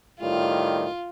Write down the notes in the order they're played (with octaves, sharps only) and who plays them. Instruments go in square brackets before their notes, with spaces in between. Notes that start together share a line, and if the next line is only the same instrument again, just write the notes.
[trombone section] A2 D#3 G3 [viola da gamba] F4